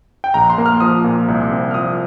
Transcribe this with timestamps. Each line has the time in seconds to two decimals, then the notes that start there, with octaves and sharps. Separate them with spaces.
0.24 G5
0.34 A#1 A#5
0.50 C6
0.58 A#3
0.66 F6
0.80 F3 D#6
1.04 A#2
1.28 C2
1.52 C4
1.71 F6
1.74 F3 D#6